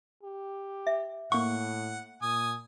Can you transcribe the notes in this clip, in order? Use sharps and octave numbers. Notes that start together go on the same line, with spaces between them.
G4
E5
A2 A#3 F#5 C#6
A#2 G#5 D#6